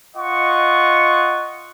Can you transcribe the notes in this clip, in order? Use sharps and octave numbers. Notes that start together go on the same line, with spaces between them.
F4 D#5 F#5 C#6